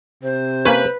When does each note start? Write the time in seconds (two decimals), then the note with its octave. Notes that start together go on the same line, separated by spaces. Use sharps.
0.23 C3 C5
0.65 A#3 C#4 B4 C#5